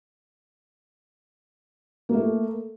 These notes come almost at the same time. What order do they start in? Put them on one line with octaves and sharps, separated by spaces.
A#3 A3 A4